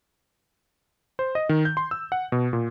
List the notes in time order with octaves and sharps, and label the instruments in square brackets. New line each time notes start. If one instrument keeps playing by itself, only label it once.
[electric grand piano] C5
D#5
D#3
G6
C6
E6
F#5
B2
A#2